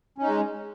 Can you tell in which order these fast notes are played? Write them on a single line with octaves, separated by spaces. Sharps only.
C#4 D#4 G#3